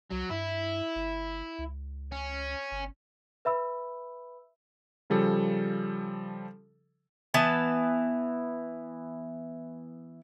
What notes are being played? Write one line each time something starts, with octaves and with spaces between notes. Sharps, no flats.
C2 F#3
G2 E4
G1
C#2
C#4
G1
B4 E5 B5 E6
C#3 F3 G3 A4
E3 B3 A5